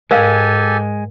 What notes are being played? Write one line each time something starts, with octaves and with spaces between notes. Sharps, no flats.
G#2 G#3 G4 A4 A#4 F5 G#5